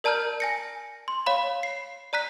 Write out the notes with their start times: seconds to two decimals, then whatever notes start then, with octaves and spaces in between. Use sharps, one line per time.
0.04 A#4 D5 A5 A#5 F6 G6
0.40 G#5 A#6 C#7
1.08 C6
1.26 C#5 F5 B5
1.63 C7
2.13 D5 A#5 F#6 B6